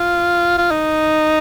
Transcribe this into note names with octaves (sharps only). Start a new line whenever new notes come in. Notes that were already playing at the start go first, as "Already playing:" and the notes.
Already playing: F4
F4
D#4